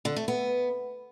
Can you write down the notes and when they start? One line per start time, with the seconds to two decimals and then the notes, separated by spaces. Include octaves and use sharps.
0.05 D3
0.16 A3
0.28 B3